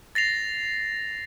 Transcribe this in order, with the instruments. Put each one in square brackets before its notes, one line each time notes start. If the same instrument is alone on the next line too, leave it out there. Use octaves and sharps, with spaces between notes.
[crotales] A6 A#6 C7 F7